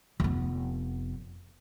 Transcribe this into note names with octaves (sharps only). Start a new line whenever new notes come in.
F1 B3